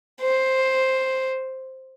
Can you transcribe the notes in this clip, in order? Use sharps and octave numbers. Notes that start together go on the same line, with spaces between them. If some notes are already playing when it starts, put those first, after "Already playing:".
C5